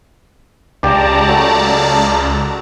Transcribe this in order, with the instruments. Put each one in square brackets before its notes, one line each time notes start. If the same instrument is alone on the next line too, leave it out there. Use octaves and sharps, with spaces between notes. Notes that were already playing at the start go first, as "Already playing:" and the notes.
[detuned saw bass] C#2 [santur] G4 [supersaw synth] D5 A5 A#5
[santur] F#3 A3